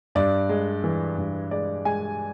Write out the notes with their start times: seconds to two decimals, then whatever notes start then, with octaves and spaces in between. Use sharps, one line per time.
0.15 G2 D5
0.49 G#3
0.84 E3
1.18 G2
1.51 G#3 D5
1.85 G#3 G#5